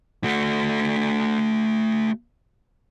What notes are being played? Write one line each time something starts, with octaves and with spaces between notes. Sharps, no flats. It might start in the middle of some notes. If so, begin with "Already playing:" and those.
A3 F#4